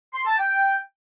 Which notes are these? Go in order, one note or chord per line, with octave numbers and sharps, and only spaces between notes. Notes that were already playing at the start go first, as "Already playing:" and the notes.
C6
A5
G5